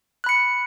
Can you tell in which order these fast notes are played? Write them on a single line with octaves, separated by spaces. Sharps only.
F#6 B5 C#7